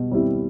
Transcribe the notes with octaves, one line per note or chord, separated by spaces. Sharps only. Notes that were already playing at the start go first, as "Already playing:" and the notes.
Already playing: B2 G3
G3 C4 E4